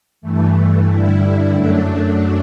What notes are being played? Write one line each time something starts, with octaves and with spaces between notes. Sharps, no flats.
G2 E3 A3
G2 D3 G3 E4
E4
F#2 F#3 A3 D4